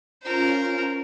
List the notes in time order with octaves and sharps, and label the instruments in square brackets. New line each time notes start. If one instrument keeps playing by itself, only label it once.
[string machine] C#4 F4 [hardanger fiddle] A#4 C5